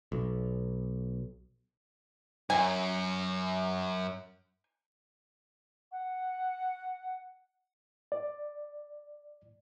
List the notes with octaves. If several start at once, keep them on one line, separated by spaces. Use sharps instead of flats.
B1
F#2 G#5
F#5
D5